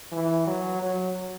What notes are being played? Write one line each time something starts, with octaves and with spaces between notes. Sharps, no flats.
E3
F#3
F#3